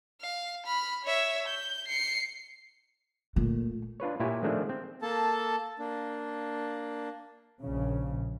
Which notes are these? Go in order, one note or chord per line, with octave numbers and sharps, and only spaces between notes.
F5
B5 F6
C#5 E5
G6
C7 C#7
A#2 A3
D4 F4 B4 C#5
A#2 E4 G4 C#5 G#5
D#3 F3 G#3 A3 C4 D4
C4
A#3 A4 A5
A#3 D4
A#1 C#3